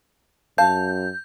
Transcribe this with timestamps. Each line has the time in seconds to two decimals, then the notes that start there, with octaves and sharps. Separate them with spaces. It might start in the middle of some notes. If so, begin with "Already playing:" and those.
0.58 F#2 F5 A5 G6